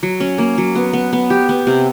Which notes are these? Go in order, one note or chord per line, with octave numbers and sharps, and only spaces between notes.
F#3
C#4
A#3
F#3
B3
B3
B3
G4
B3
C3